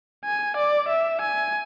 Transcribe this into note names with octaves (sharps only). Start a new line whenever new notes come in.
G#5
D5
E5
G#5